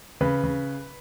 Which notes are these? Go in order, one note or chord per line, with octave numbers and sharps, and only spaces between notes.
C#3 B4
C#3